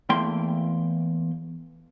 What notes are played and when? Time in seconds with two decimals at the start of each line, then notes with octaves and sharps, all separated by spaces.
0.09 E2 E3 A3 A#3 G5 C6